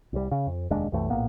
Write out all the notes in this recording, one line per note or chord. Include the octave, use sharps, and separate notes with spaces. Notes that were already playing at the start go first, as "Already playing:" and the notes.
C2 G3
C#3
F2
F1 D#2 G#3 D4
C2 F#2 E3 A3
A#1 A2 A#3 B3